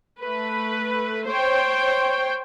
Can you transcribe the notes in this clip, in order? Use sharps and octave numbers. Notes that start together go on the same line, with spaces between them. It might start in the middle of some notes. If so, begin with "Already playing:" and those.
A3 B4
C5 C#5 G5